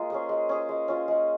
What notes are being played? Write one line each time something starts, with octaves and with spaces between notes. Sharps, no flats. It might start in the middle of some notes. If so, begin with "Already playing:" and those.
Already playing: G#3 A#3 F4
C#4 G#4 C5
G#3
C#4 G#4 C5
G#3
C#4 F4
G#3